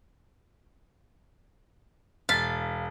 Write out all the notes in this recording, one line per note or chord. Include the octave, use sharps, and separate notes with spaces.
E1 F5 A6 B6